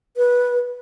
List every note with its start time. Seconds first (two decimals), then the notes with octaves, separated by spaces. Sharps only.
0.17 B4